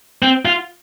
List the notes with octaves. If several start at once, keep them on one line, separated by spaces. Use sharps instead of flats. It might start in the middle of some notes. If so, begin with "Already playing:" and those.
C4
F4